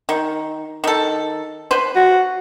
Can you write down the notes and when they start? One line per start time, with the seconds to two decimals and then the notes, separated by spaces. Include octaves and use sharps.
0.09 D#3
0.84 D#3 A4
1.71 B4 C5
1.95 F#4